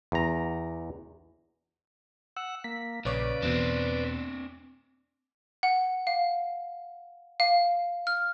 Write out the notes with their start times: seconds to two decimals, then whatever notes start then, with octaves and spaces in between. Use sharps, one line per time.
0.12 E2 A#5
2.37 F#5 E6
2.64 A#3 B6
3.05 A#1 C#3 B4 C#5 D5 D6
3.42 E2 B2 C4 D4
5.63 F#5
6.07 F5
7.40 F5
8.07 F6